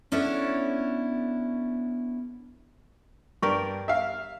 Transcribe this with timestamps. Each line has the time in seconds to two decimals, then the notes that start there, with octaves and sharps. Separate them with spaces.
0.12 B3 C#4 D4 E4 A4 C#5
3.43 G2 G4 A#4 D5 C#6
3.88 E5 F5